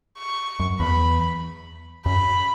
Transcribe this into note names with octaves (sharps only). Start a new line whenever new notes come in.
C#6
F#2
E2 B5
F#2 B5